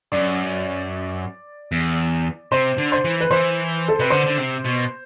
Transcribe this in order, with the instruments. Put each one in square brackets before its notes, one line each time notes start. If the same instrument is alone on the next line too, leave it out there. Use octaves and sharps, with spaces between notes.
[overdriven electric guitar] F#2 [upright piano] D5
[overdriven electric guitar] E2
[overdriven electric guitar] C3 [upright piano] C5
[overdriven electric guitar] D3
[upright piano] C5
[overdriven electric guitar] E3
[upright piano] B4
[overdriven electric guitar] E3 [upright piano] C5
[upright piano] A4
[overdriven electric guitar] C3 [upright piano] B4
[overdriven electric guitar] D3 [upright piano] C5
[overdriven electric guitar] D3
C3
B2